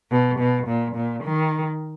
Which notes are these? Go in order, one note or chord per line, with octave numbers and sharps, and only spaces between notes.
B2
B2
A#2
A#2
D#3